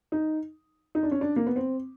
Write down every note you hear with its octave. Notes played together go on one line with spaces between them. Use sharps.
D#4
D#4
D4
C#4
D4
A#3
B3
C4